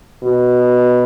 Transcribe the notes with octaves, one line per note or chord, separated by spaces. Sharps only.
B2